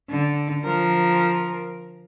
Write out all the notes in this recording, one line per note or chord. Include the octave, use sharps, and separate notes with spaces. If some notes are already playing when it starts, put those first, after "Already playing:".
D3
F3 A#4